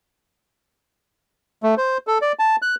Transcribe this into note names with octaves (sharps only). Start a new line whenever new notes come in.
A3
C5
A4
D5
A5
F#6